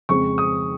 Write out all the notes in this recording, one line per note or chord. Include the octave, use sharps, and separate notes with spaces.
F2 C#3 G#3 C4 C#6
D#6